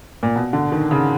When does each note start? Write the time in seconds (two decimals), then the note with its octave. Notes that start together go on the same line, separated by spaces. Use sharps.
0.23 A#2
0.35 B2
0.53 D3
0.72 D#3
0.91 C#3